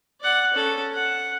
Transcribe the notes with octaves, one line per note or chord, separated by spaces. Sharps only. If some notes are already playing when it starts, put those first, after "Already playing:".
D5 F#5
C#4 A4
F#5